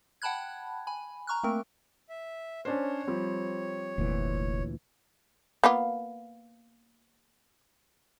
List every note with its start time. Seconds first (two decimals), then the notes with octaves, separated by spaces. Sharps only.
0.22 F#5 G5 A5 B5 F#6 G#6
0.87 G#5 B5
1.27 A#5 C#6 F6 F#6
1.43 A3 A#3 C4 A#4
2.09 E5
2.65 C#4 D4 C5 C#5
3.07 F3 G3 C4
3.98 F1 D2 A#2 E3
5.64 A#3 B3 F4